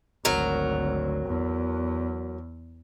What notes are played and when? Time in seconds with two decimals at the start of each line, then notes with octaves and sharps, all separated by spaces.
0.25 G#1 D2 F#3 A#4
1.26 E2